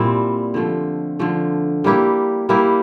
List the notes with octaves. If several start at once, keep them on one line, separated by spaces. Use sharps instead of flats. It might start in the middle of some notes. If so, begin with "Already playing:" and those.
Already playing: A#2 G3 C4 E4
D3 F3 A3
D3 F3 A3
G3 A#3 E4 G4
G3 A#3 E4 G4